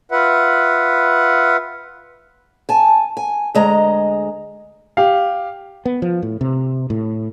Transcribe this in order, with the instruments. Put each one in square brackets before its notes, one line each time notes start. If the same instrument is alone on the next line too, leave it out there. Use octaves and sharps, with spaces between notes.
[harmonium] F4 B4 E5 F#5
[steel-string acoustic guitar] G#5 A5
G#5
D2 G#3 D#5 A#5
[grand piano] G4 F5
[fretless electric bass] B3
F3
A2
C3
A2